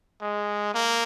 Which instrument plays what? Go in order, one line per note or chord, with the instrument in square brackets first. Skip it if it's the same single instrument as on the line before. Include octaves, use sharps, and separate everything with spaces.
[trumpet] G#3
A#3